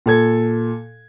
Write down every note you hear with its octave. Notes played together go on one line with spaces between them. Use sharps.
A#2 A4 G#6